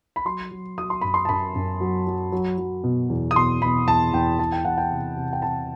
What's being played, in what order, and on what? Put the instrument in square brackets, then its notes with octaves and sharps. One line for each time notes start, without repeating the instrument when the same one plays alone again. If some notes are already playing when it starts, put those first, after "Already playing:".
[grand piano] B5
F#3 C6
F#3
F#3 D#6
C6
F#2 B5
C6
A5
F#2 B5
F#2
F#3
F#3
F#3
F#3
B2
E2
D#6
B2 C6
B2 B5
E2 A5
E2 G5
E2 A5
G5
E2 F#5
G5
C3
C3
G5
C3 A5